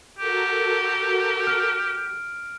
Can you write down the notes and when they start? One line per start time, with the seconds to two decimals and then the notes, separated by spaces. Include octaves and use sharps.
0.18 F#4 G4 A4 A#4
1.47 F6 D7